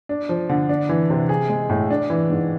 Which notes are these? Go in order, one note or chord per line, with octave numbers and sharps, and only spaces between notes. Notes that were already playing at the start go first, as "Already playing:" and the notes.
D4
F3
D3
D4
E3
C3
G#4
G#3
A2
D4
E3
G#2